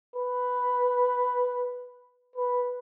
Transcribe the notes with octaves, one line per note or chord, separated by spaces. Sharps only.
B4
B4